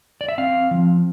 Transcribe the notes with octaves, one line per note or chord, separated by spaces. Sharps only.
D5
E5
C4 F5
F3